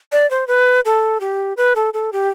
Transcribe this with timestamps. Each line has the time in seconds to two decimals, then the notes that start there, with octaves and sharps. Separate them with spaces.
0.12 D5
0.30 C5
0.48 B4
0.85 A4
1.21 G4
1.57 B4
1.76 A4
1.94 A4
2.13 G4